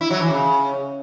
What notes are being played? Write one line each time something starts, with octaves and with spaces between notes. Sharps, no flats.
E4
F#3
E3
C#3